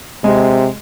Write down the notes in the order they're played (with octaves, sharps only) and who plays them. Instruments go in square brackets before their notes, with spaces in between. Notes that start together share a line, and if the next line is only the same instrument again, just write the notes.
[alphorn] C3 [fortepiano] G#3